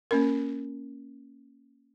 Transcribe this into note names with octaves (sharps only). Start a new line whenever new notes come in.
A#3 C#4 A#4